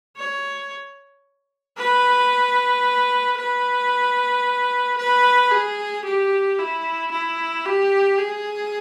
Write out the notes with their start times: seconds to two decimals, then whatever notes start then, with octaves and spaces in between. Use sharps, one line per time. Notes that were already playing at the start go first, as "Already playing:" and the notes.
0.17 C#5
1.78 B4
3.38 B4
4.98 B4
5.51 G#4
6.04 G4
6.59 E4
7.12 E4
7.65 G4
8.18 G#4